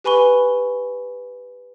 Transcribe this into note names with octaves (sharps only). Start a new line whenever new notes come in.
G4 B4 G#5 B5 C#6 G7